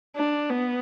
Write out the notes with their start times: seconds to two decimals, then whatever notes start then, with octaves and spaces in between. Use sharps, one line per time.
0.16 D4
0.50 B3